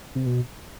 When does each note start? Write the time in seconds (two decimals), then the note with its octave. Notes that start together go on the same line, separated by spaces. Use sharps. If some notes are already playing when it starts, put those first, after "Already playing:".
0.15 C3
0.26 B2